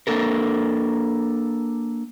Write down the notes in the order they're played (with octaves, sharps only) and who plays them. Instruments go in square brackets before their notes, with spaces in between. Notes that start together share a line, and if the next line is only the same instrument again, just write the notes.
[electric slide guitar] A#3 D4 A4 A#4